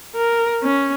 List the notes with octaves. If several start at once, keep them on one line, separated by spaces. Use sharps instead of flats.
A#4
C#4